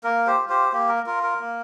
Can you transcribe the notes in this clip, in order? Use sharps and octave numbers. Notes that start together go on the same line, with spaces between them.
A#3 A#4
G4 C5
F4
G4 C5
A#3 G4
A#4
F4 A#4
A#4
A#3